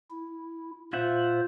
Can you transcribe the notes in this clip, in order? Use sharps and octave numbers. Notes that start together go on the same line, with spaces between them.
E4
A#2 F4 C5 E5 F#5